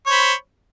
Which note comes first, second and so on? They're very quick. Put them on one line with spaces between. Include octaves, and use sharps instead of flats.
C#5 C5 B5